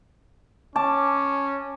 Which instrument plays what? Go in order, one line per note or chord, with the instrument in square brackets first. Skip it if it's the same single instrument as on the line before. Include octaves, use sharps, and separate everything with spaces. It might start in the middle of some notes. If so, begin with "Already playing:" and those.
[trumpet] C#4 [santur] A5 D6